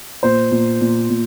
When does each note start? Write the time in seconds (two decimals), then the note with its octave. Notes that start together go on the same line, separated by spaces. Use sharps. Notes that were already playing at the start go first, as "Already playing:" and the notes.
0.23 A#2 C5
0.51 A#2
0.81 A#2
1.10 A#2